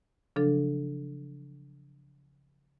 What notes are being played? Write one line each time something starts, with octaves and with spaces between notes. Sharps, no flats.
C#3 F3 F#3 D4 A4